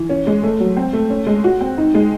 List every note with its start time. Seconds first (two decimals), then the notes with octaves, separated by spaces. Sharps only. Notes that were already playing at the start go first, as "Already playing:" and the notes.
Already playing: E3
0.10 C#4
0.27 G#3
0.43 A3
0.60 F#3
0.77 C4
0.93 A3
1.10 C#4
1.27 G#3
1.44 F#4
1.61 C4
1.78 D#4
1.95 G#3